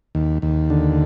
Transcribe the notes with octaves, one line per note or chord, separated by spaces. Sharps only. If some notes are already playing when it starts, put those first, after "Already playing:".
D#2
D#2
D3